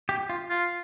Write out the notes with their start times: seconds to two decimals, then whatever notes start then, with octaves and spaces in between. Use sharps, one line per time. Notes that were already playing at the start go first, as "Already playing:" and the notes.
0.09 G4
0.30 F4
0.50 F4